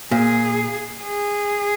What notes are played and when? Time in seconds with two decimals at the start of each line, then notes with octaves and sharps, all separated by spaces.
0.11 A#2 G#4
1.02 G#4